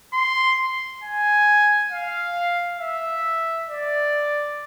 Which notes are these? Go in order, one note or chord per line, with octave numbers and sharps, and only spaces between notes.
C6
G#5
F5
E5
D5